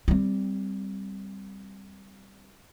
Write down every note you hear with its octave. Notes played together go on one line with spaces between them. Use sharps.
G3 C4